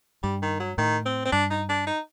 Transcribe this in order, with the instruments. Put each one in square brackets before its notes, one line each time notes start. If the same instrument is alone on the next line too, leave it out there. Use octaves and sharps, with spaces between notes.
[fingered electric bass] G2 [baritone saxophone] G3
[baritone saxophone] D#3
F#3
[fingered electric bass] A2 [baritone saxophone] D#3
[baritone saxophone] C4
C4
[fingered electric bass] G2 [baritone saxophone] D4
[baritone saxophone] D#4
D4
D#4